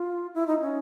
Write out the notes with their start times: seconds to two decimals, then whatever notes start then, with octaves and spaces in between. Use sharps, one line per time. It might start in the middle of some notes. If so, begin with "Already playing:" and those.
Already playing: F4
0.35 E4
0.48 D#4
0.61 C#4